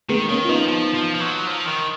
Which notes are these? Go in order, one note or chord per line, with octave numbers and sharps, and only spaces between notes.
D#3 G#3 B3
D#3 A#3 C#4
F4
F3 B3 D#4
F3
F3
F3
F#3
F3
D#3